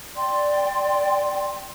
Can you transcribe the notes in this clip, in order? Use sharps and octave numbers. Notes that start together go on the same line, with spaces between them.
D5 G5 C6